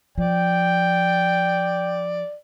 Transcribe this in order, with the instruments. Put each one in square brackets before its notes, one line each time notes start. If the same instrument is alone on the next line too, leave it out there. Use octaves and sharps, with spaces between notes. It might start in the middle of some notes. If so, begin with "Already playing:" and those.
[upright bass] F3 [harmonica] D5 [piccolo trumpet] G5